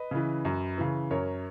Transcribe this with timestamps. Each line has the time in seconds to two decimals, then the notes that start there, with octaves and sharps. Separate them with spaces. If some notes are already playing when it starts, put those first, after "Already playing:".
Already playing: B4 D#5
0.11 C#3 E3
0.45 F#2
0.78 C#3 E3
1.11 F#2 A#4 C#5